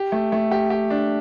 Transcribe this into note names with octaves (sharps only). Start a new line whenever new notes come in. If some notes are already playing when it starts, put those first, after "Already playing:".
Already playing: G4
A3
A3
G4
G4
D4